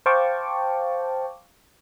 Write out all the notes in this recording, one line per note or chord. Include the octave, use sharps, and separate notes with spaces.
C5 F5 G5 A5 C#6 D6